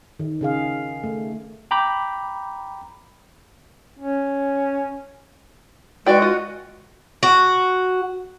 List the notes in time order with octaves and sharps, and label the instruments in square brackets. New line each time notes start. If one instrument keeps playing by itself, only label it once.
[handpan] D#3
C#3 G#4 F5
A3
[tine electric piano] G5 A#5 B5 D6 G6
[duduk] C#4
[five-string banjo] E3 D5 G5 [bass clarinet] G#3 [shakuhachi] F#4
[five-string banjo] F4 D#5
[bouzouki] F#4